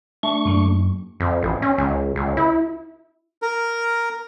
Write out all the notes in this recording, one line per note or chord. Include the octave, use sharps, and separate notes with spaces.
A3 D4 C#6
F#2 A#3
F2
A1
C#4
C#2
C#2
E4
A#4